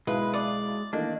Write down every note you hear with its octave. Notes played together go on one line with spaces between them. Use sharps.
B1 G#3 E4 B4 F5
D5
D#3 E3 A3 A#3 D4 D#5